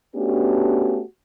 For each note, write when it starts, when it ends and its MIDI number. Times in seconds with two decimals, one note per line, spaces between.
0.16 1.02 57
0.16 1.02 59
0.16 1.02 61
0.16 1.02 62
0.16 1.02 66
0.16 1.02 67